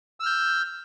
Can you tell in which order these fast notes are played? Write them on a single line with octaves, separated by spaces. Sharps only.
E6 F6 G6